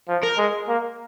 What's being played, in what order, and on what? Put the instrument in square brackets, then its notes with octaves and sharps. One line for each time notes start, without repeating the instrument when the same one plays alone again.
[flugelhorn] F3
[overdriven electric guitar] A#4
[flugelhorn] G#3
A#3